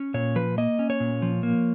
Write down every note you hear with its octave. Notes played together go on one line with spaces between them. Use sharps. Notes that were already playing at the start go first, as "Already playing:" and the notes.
Already playing: C#4
A#2 C#5
F3 B4
A#3 D#5
C#4
C#5
A#2
F3
A#3